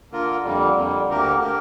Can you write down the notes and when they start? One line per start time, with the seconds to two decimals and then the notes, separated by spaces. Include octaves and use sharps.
0.11 D3 A#3 F4 A#4
0.44 F2 D3 G3 A#3
0.76 F2 D3 G3 A#3
1.08 D2 D3 A#3 G4 A#4
1.39 D3 A#3 G4 A#4